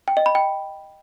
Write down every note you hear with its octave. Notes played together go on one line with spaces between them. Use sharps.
G5
D#5
B5
G5